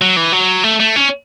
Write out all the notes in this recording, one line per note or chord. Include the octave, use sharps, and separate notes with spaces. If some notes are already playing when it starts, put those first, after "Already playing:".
F#3
E3
F#3
A3
A3
C#4